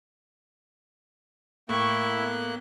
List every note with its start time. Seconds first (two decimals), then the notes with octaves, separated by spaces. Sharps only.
1.69 A2 A#3 E4 G5 C#6 F#6
2.16 B3